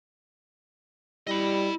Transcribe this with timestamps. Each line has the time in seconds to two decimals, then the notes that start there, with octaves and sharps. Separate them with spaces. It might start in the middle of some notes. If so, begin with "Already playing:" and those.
1.27 G3 E4 D#5 B5